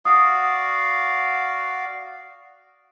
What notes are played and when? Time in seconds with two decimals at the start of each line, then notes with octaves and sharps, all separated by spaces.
0.05 F#4 D5 F5 D#6